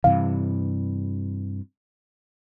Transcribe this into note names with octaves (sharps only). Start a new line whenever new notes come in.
G2 C3 E3 F5